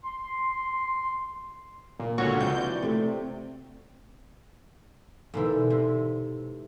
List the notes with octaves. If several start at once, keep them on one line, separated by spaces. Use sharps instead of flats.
C6
A#2
C#2 A#2 D3 F#4 C#5
C#2 C3 E3 F3 G6
D5
C3 A3
G#2 B2 D3 E3 C4
C3